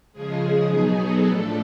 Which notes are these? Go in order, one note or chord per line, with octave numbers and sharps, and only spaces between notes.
C#3 F3 G#3 G#4
B2 F#3 B3 D#4
A4
A2 F3 A3 D4